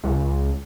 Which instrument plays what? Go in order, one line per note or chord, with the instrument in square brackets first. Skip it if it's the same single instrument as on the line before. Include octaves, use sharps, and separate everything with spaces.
[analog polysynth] C#2